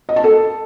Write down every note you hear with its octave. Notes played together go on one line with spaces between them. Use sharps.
D#5
A5
A4